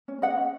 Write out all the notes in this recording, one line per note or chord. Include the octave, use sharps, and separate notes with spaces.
C#4
C#4 D#5 F#5
C#4